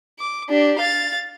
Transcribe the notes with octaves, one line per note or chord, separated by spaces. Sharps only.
D6
D4 G4
F5 A6